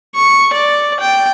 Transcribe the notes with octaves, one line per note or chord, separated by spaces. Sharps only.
C#6
D5
G5